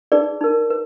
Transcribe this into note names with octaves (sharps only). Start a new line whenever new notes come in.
D#4 G#4 B4 D5
D#4 A#4
B4